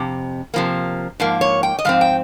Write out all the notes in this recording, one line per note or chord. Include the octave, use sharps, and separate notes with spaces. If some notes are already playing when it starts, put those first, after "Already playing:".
Already playing: F2 C3
C3 F3 A#3
G#2 F3 A#3
C#5
G5
D#5
G#2 F3 C4 F5
G5